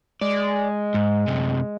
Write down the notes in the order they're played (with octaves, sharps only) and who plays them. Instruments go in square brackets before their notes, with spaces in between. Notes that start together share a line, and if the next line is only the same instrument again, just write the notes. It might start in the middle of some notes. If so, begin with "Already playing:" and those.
[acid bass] G#3 [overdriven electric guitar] D5
[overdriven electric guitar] G#2
F#2 C3